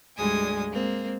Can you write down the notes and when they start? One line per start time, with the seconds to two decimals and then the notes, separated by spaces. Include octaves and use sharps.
0.17 D2 G#2 G3 G#3 G#5 D#6
0.71 G#3 A#3 C4